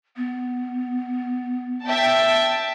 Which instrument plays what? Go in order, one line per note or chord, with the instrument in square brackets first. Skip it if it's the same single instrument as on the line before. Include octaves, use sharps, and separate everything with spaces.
[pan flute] B3
[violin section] E5 G5 A5